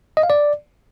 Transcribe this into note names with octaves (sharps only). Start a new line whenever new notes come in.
D#5
F5
D5